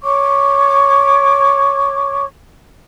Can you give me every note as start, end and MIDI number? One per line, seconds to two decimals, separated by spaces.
0.03 2.23 73
0.03 2.23 85
0.03 2.23 86